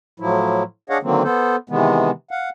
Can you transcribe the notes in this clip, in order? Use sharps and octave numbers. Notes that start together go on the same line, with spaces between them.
A2 F3 F#3 E4
D4 G#4 C#5 D#5 F5 F#5
D3 D#3 F#3 A#3 C4
B3 A4 C5
C3 D#3 E3 G#3 B3
F5 F#5